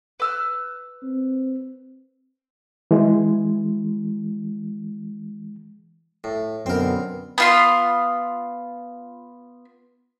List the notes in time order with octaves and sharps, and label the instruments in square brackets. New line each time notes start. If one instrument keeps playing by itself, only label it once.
[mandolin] B4 E6 F6
[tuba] C4
[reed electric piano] E3 G#3
[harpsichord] A2
[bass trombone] F#2 [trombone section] B2 D3 B3 [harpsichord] C4 A#4
[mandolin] B3 F4 C6